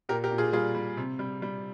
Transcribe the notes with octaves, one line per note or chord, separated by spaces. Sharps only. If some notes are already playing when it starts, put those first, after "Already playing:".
A#2 G4 A#4
G4 A#4
A#2
F4 G#4
G3 F4 G#4
G3
C3
G3
G3